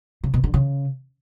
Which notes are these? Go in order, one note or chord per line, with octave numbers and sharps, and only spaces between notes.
C#3
B2
D3
C#3